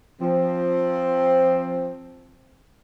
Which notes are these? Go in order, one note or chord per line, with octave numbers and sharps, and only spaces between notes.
F3 C4